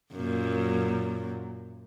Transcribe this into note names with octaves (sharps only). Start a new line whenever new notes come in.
F#2 A#2